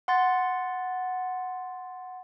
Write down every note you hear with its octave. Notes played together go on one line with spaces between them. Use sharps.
F#5 C6 A6